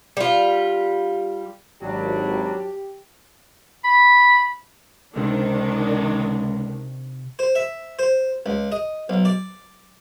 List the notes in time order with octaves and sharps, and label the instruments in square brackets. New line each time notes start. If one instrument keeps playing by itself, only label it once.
[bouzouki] G3 F4
[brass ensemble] G#1 [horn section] F#3 G3 D4 [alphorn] G4
[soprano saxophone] B5
[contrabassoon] C#2 [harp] C3 [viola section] D#3 D4
[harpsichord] C5
E5
C5
C#2
D#5
B1
D5